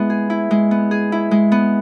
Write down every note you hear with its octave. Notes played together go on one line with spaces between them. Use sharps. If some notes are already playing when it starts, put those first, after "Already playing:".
Already playing: G#3 B3 E4
G#4
E4
G#3
B3
G#4
E4
G#3
B3